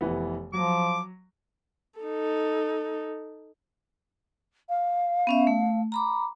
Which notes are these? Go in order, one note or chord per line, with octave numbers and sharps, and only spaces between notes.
F1 E3 B3
F3 F#3 D6
D#4 A4
F5
B3 C#4 E5
A3
A#5 B5 D6